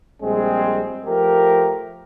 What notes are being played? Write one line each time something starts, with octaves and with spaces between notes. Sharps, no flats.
A#1 G3 G#3 C4 G#4
F3 A3 G4 A#4